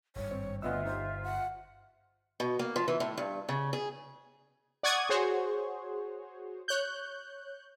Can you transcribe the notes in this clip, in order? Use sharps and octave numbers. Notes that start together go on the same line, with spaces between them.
G#1 G2 C#5
C4
G1 D2 B3 F4 D#5 E5 E6
D#4 G4 C5
F#5
B2
A#3
F3
E3
A2
G2
C#3
G#4
D5 F#5 C#6 D#6 G#6
F#4 G#4 C5 C#5
C#5 F#6 G6